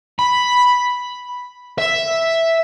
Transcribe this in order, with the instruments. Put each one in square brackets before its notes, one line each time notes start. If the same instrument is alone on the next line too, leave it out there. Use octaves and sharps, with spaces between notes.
[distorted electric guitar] B5
E5